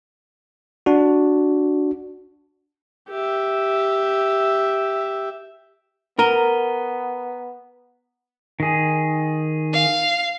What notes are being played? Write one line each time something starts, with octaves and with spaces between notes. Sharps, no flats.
D4 F#4
G4 E5
B3 A#4 A#5 D#7 G7
D#3 G#4
F5